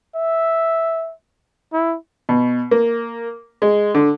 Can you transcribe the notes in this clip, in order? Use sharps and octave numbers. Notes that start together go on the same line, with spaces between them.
E5
E4
B2
A#3
G#3
D3